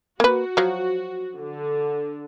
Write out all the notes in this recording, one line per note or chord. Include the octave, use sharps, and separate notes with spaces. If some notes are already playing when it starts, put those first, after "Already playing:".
A#3 F#4 B4
F3 F#3
D3